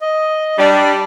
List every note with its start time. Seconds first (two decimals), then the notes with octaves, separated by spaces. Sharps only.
0.01 D#5
0.58 G3 D4